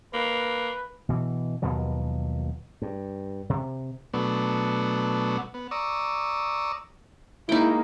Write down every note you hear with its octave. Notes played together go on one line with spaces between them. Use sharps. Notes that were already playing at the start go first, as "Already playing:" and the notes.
A#3 B4
B2 E3
D#2 B2 F3 F#3
G2
C3
B2 F#3 A3 B3 D4
B3
D5 A#5 C#6 D#6 E6
G#3 A#3 D#4 E4 G5